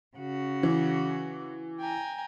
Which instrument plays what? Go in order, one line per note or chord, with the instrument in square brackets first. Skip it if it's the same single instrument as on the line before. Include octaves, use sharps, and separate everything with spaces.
[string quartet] C#3 F#4
[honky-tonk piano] E3
[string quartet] G5 G#5 A#5